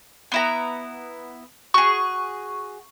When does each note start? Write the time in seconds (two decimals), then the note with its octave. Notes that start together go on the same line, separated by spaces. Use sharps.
0.32 B3 E4 A#5
1.74 F#4 G#4 C#6